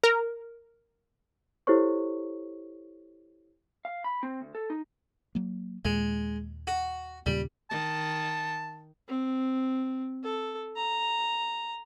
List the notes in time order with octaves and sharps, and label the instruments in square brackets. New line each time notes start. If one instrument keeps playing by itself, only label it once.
[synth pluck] A#4
[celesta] E4 G4 A4 C5 C#5 C#6
[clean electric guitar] F5
B5
C4
D2
A4
D#4
[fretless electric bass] F#3 A#3
[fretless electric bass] D#2 A#2 [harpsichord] G#3
[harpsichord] F#4
[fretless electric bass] D#2 A#2 C#3 [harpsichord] G3
[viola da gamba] D#3 [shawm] A5
[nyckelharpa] C4
A4
A#5